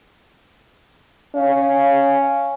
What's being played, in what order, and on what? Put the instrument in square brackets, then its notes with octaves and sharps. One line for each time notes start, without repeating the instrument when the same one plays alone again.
[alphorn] C#4 [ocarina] F5